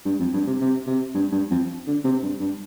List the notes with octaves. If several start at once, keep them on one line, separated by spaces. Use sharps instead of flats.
G2
F2
G2
C3
C3
C3
G2
G2
F2
D3
C3
G2
G2